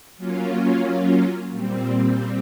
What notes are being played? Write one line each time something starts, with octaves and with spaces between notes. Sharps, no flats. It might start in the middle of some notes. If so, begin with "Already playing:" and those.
F#3 A#3 C#4 F4
A#2 G3 C4